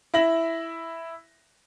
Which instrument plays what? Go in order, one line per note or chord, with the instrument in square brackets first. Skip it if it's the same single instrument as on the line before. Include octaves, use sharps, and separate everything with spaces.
[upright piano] E4 E5 A#6 F#7